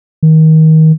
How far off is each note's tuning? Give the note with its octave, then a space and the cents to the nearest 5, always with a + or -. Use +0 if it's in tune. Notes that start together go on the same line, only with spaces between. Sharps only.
D#3 +25